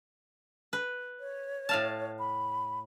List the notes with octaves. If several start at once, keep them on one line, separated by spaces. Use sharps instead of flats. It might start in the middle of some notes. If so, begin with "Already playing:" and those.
B4
C#5
A2 F5 A5
B5